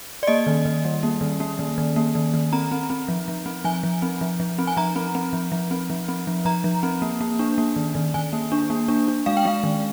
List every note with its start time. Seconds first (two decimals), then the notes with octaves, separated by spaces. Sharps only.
0.23 D5
0.27 A#3 D#5
0.47 D#3
0.66 D#3
0.85 G3
1.03 A#3
1.21 D#3
1.40 A#3
1.59 D#3
1.78 D#3
1.96 A#3
2.15 D#3
2.34 D#3
2.53 C4 A#5
2.72 C4
2.90 C4
3.08 F3
3.28 F3
3.46 C4
3.64 F3 G#5
3.83 F3
4.02 C4
4.21 F3
4.40 F3
4.59 C4
4.67 G#5
4.77 F3 A#5
4.96 C4
5.15 C4
5.33 F3
5.52 F3
5.71 C4
5.90 F3
6.09 C4
6.27 F3
6.45 F3 A#5
6.64 F3
6.83 C4
7.02 A#3
7.21 A#3
7.39 D4
7.58 A#3
7.76 D#3
7.95 D#3
8.14 D#3 G#5
8.33 A#3
8.52 D4
8.70 A#3
8.88 D4
9.08 D4
9.26 G#3 F5
9.37 G5
9.45 G#3 F5
9.64 D#3